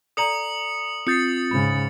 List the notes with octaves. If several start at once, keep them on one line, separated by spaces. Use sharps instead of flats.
A4 D5 A#5 D#6 C#7 F#7
C4 F4 D#6 G6 A6 C7 C#7
G#2 C#3 B5